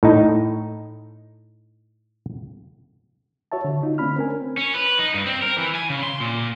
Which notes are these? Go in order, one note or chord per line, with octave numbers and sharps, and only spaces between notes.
A2 D#4
F#4 C#5 E5 A5
D3
D#4 F4
D3 A3 C4 D4 B5 F6
C4 C#4 A#4 G#5
C#4
B4
D#4
G2
C4
A#4
E3
G#5
C#3
C6
A#2